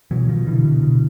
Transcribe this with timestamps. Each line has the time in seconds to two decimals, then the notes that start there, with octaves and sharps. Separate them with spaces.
0.11 B2 E3 F#3
0.28 B2 D#3 F3
0.47 B2 D3 E3
0.65 B2
0.83 B2